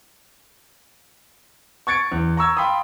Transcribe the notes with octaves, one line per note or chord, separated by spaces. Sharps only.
C#6 G#6 A6 C#7 D7
E2
A#5 C#6 E6 G#6
F5 G5 B5 C6 D#6